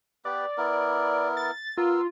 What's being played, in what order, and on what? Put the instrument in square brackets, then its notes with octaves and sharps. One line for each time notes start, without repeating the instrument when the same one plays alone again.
[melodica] B3 G4 B4 [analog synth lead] D5
[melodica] B3 E4 A#4
[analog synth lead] A6
[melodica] B3 A#4 E6 [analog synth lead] F4